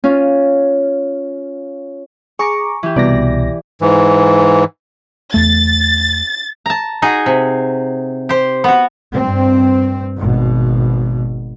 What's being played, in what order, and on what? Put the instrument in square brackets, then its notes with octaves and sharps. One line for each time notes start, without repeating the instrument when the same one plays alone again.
[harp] C#4 F4
[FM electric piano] G#4 A#5 D6 [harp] C#6
[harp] E3 G4
[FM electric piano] C2 B2 A#6 [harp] D5
[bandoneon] G#2 E3
[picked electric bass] E2 A3 [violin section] A6
[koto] A5 A#5
D#4 F#4 G#4 D#5
C3
G4 C5
B3 F#4
[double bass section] G2 C4
G#1 B2